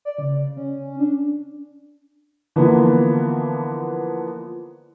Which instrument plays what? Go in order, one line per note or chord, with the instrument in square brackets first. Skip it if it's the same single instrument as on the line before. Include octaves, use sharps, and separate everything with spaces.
[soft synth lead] D5
C#3
C#4
D4
[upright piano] D3 E3 F3 A#3 B3